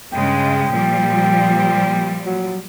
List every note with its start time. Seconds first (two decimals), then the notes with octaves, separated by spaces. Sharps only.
0.13 G2 C#3 G#3 G5
0.71 A#2 F3 G3
2.26 F#3